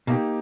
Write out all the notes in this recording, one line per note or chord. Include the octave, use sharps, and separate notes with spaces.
B2 A#3 D#4 G4